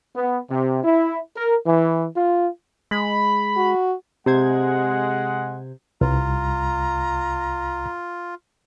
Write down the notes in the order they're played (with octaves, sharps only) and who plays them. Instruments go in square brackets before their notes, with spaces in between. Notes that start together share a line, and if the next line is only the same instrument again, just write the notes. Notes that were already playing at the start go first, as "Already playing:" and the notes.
[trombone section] B3
C3
E4
A#4
E3
F4
[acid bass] G#3 [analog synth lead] B5
[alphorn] F#4
[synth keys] C3 C5 G#6 [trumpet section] G#3 F#5
[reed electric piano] C2 [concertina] F4 [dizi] A#5